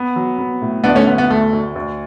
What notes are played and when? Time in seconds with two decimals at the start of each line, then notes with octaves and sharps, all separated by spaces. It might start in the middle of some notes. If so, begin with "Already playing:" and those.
Already playing: B3
0.16 F#3
0.38 B3
0.62 A2
0.84 D2 B3 D4
0.95 A3 C#4
1.07 D2 B3
1.18 B3
1.30 D2 A3
1.53 D2
1.76 D2